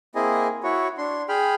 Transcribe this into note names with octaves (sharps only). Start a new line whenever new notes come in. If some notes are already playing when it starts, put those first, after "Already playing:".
A#3 C4 E4 G#4 D#5 G#5
E4 F#4 C#5
D4 C6
G#4 G5 B5 F6